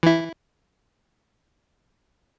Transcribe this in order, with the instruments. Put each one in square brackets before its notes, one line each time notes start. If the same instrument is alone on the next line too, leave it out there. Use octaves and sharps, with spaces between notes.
[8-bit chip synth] E3 E4